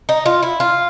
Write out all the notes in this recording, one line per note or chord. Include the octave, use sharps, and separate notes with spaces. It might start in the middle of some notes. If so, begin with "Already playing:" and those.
D#4
F4
E4
F4